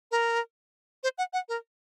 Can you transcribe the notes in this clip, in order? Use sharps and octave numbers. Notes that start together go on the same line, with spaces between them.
A#4
C5
F#5
F#5
A#4